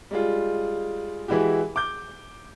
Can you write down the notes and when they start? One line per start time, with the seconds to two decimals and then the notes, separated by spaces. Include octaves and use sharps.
0.11 G3 G#3 F4
1.28 E3 G#3 E4 F#4 G4
1.76 D6 G6